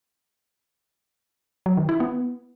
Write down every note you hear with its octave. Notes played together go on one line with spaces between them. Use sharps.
F#3
D#3
E4
B3